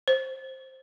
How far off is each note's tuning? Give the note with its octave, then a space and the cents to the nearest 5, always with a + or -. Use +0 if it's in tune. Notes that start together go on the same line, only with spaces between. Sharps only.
C5 +10